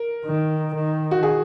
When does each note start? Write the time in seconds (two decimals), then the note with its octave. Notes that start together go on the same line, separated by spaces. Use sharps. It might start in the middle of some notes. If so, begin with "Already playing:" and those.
Already playing: A#4
0.25 D#3
0.74 D#3
1.11 F#4
1.23 G#4